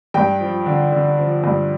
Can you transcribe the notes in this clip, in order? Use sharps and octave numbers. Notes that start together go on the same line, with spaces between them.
G2 G5
F3
D3
D3
F3
G2